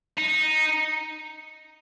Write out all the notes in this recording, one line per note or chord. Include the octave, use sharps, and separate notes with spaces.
D#4